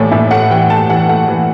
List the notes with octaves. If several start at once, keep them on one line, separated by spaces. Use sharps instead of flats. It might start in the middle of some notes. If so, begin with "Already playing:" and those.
Already playing: A1 A2 E3 A3 C#5 D5
A2 E5
A3 F#5
E3 G5
A3 A5
E3 F#5
A3 F#5
E3